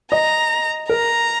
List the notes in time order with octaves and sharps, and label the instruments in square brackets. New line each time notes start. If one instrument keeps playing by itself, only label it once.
[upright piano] D#5 [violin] A#5
[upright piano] A#4 [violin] A#5